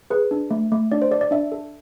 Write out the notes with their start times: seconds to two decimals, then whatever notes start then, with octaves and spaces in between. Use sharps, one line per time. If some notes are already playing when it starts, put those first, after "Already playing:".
0.10 G#4 B4
0.31 D4
0.51 A3
0.72 A3
0.92 D4 D5
1.02 C5
1.11 A4 D5
1.21 D5
1.31 D4 E5
1.52 A4